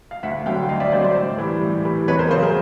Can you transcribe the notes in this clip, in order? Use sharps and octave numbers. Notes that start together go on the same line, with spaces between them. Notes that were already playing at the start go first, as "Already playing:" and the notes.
F5
D2 E5 F#5
D3 F#3 F5 G5
D2 D#5 F5
D5 E5
D3 F#3 C5 D5
C5 D5
A2
E3 G3
A2
E3 G3
E2 B4 C#5
A#4 C5
C#3 F#3 A#4 C5
G#4 A#4